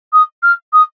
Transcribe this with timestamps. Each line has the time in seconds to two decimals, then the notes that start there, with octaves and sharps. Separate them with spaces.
0.13 D#6
0.43 F6
0.73 D#6